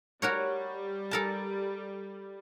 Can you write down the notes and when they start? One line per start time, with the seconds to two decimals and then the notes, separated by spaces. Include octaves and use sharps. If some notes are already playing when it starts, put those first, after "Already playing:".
0.22 G3 F#4 A#4 C#5
1.11 A4 A#4 A5